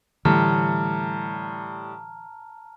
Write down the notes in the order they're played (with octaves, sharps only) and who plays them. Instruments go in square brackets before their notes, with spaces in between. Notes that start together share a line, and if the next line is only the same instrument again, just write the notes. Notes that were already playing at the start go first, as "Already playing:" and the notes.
[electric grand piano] A2 G3 [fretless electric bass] D3 E3 A3 [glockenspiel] A5 A#5 F6